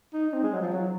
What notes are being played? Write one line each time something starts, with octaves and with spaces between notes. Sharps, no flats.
D#4
C4
G#3
F#3
F3
F#3